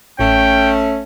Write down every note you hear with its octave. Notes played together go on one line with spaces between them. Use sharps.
A1 A3 C#4 G5